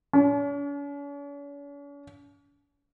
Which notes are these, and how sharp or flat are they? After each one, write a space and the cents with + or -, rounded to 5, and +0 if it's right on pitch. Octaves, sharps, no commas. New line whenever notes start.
C#4 +45